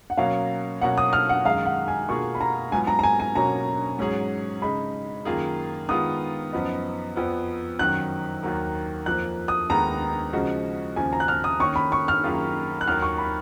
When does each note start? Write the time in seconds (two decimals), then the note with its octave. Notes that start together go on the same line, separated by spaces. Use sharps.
0.10 F#5
0.18 B2 F#3 A#3 C#4 F5
0.81 B2 F#3 A#3 C#4 F#5
0.98 D#6
1.13 F6
1.29 F#5
1.45 F#2 D#3 G#3 F5
1.66 F#5
1.88 G#5
2.09 B2 A#3 F4 G#4 C#6
2.35 B5
2.40 A#5
2.72 G#2 F#3 B3 F4 G#5
2.87 A#5
2.99 A#5
3.03 G#5
3.20 G#5
3.35 B2 F#3 A#3 C#4 A#5
3.99 G#2 F#3 C#4 G#4
4.62 C#3 G#3 D#4 B5
5.25 F#2 D#3 A#3 F4 G#4
5.89 D#3 G#3 B3 F4 D#6
6.53 F#2 F3 B3 D#4
7.16 F2 F3 B3
7.79 F#2 D#3 F#3 F#6
8.43 D#2 D#3 F#3 A#3
9.06 F2 F3 A#3 F#6
9.48 D#6
9.70 D#2 D#3 G#3 B3 A#5
10.33 C#3 F3 G#3 D#4 F#4
10.96 D#2 C#3 F3 G#5
11.13 A#5
11.20 F#6
11.28 F6
11.44 D#6
11.60 D#3 A#3 C#4 C#6
11.76 B5
11.92 C#6
12.08 F6
12.24 F#2 D#3 A#3 F4 G#4
12.81 F#6
12.87 D#2 D#3 F#3 A#3 F6
13.02 C#6
13.18 B5